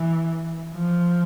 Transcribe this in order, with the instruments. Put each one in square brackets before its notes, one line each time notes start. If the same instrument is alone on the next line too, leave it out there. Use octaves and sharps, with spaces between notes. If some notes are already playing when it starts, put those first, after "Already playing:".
Already playing: [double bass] E3
F3